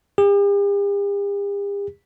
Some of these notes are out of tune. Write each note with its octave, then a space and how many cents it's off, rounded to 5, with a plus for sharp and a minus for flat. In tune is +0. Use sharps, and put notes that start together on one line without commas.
G4 +45